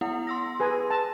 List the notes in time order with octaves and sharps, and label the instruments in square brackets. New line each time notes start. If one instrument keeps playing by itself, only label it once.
[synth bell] B3 E4 F#5
C6 E6 A#6
[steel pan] G#4 B4 G#5
A5